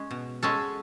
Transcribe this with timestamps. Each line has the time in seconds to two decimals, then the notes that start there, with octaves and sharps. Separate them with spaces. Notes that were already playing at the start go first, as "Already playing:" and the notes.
Already playing: G#3 C#4
0.11 B2
0.43 G#3 C#4 F#4 A4